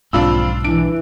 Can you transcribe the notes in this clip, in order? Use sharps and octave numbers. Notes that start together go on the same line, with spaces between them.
B1 F2 G#2 C4 D4 F4 B5 E6
E3 D4 D7